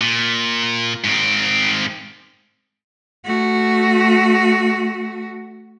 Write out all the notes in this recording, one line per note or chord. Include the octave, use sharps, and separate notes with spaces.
A#2
G#2 C4
A3 F#4